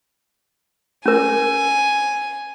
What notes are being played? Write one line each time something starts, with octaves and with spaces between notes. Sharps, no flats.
C#4 A#4 G#5